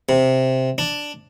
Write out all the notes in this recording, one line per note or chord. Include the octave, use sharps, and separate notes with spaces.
C3
D4